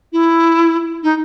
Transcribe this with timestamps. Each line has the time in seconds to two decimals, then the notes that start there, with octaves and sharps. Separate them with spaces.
0.13 E4
1.03 D#4